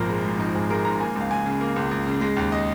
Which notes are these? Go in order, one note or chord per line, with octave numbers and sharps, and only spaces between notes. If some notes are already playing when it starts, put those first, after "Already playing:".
Already playing: G#1 A#2 F3 A#4
G#3
G#2
F3 D#4
G#1 G#4
G#3 A#4
G#2 A#5
A#3 G#5
C#2
F5
C#2 G#5
C#3
A#3
C#2
C#2
C#3
G#3
D#2
D#5